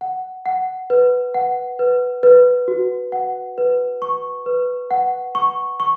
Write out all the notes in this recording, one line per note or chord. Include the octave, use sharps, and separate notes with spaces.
F#5
F#5
B4
F#5
B4
B4
F#4
F#5
B4
C#6
B4
F#5
C#6
C#6